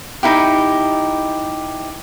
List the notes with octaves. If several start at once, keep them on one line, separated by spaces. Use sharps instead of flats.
D#4 E4 G4